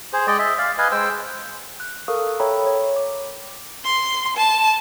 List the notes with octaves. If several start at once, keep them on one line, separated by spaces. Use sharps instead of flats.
G#4 C5
G#3 D5 D#5 G5
D#5 E5
D5 F5
B4 D#5 F5 G#5
G#3 C5 G5 E6
F#6
A4 A#4 F5 C#6 D#6
A4 C#5 E5 G5 A#5 B5
C#5
D6
C6
A5